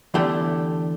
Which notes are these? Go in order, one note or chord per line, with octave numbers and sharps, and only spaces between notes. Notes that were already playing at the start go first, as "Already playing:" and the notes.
E2 D3 A3 G4